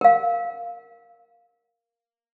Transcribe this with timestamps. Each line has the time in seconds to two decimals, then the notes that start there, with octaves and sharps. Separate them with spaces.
0.01 A#4 F5